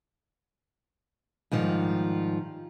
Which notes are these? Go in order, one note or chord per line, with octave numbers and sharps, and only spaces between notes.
G#2 D#3 F3 G3